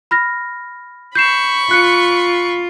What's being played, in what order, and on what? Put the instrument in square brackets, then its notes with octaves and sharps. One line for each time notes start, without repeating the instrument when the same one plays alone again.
[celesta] B5 F6 A#6
[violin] B5 C#6 [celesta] G6 C7 E7
[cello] F4 [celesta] F#6 C#7